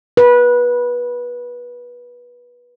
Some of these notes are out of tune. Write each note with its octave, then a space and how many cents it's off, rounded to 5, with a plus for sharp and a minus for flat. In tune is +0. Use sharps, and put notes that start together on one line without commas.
B4 -20